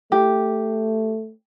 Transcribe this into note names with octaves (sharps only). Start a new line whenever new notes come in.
A3 G4